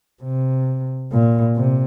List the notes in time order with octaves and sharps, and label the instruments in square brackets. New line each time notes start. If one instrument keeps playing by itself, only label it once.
[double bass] C3
A#2
C3